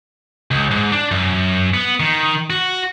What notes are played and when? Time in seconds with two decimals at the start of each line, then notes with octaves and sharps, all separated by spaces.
0.51 C#2
0.71 G#2
0.92 D4
1.11 F#2
1.74 B3
2.00 D#3
2.50 F#4